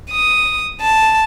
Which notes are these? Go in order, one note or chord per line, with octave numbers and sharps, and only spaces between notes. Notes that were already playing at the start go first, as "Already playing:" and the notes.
D#6
A5